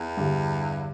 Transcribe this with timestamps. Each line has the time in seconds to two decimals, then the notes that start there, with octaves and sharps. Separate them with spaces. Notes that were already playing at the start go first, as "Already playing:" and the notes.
Already playing: E2
0.17 G2 D3 G3